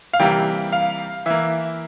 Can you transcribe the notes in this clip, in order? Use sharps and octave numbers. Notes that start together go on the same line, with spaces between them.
F5
C3 E3 G3 A#3 G5
F5
E3 A#3 E5